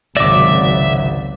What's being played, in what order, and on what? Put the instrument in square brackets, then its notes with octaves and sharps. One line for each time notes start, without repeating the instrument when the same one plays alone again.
[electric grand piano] G#1 A#6 [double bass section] C#2 C3 F#3 [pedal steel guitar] D5 D6 [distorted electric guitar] E5